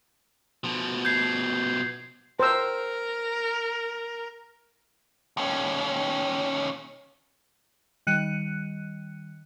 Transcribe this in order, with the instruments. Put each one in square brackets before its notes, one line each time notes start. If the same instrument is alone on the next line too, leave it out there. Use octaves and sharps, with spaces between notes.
[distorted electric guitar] B2 F3
[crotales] G6 G#6 C7
[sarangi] A#4 [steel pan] C5 E6
[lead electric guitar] D#2 C#4
[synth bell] D#3 G3 F#6 C#7 D#7